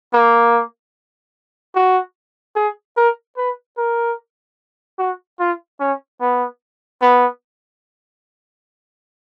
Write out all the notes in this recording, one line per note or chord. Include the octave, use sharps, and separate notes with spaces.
A#3
F#4
G#4
A#4
B4
A#4
F#4
F4
C#4
B3
B3